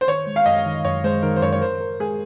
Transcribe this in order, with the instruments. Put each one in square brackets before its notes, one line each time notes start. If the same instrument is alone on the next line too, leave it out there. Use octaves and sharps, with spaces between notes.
[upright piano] C5
[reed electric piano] D#3 [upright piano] C#5
[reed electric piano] G#3
[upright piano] F5
[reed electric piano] F#2 [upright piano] D#5
[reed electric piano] D#3
[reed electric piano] F#2 [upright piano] C#5
[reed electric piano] G#3 [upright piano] C5
[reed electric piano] D#3 [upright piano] A#4
[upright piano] C5
[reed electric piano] F#2 [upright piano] C#5
[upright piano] C#5
[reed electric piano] A#4 [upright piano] C5
[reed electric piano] A#4
[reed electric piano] G#3 [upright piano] G#4